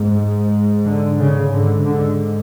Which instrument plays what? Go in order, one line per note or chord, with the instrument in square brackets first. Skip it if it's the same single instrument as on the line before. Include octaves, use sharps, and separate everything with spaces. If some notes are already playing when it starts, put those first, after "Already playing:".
Already playing: [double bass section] G#2
D3
C#3
G#2 D3
D3